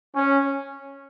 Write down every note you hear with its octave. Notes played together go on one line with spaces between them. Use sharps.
C#4